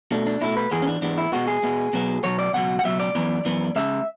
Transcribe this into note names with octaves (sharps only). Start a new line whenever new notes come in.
B2 A3 D4
D4
B2 A3 E4
B4
G#2 E3 G#3 B3 G#4
C#4
D4
G#2 E3 G#3 B3 D4
E4
B2 G#3 B3 F#4
G#4
B2 G#3 B3
B2 F#3 B3
B2 F#3 B3 C#5
D5
C#2 B2 F#3 F#5
F#5
C#2 B2 F#3 E5
D5
F#2 E3 B3
F#2 E3 B3
C#2 C#3 G#3 E5